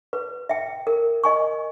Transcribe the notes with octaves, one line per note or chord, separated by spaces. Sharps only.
B4
E5 G5
A#4
D#5 G#5 C#6